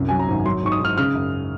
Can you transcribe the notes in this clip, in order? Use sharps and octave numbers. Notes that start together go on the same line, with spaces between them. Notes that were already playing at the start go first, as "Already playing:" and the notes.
Already playing: C2 F#2
F#3 G#5
A#5
G#1
F#3 C6
G#2 C#6
D#6
G#2 F6
C#3 F6
F#2